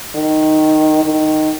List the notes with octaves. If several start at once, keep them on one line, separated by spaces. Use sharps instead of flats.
D#3
D#3